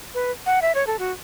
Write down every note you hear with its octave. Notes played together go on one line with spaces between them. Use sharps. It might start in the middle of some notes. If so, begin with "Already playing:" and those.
B4
F#5
E5
C#5
A4
F#4